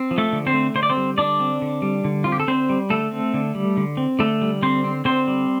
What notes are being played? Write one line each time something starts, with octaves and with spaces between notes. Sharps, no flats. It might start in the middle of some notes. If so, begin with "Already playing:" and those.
Already playing: C4
F3
A3 A4
D3
C4 C5
A3
D3 C5
D5
C4 C5
G3
D3 D4 D5
C4
D3
G3
D3
C4 F4
G4
A4
D3 C4 C5
G3
D3 A3 A4
C4
D3
G3
D3
C4
D3 A3 A4
G3
D3 C4 C5
C4
D3 C4 C5
G3